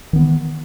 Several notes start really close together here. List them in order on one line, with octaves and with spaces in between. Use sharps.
D#3 B3 E3